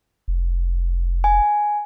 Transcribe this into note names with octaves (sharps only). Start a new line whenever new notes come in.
F1
G#5